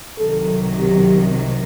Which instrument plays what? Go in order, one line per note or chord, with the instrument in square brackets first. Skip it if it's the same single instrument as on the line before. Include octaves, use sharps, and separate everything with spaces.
[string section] C2 C3 D#3 F#3 [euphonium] A4
[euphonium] G4